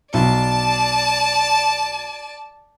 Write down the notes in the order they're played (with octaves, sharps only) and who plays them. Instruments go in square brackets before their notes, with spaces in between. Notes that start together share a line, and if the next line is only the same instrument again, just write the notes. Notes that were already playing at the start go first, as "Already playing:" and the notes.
[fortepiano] B1 [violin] D5 A5